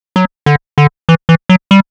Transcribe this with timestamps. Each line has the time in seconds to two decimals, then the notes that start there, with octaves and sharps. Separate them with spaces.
0.16 F#3
0.46 D3
0.78 D3
1.09 E3
1.29 E3
1.49 F#3
1.71 G3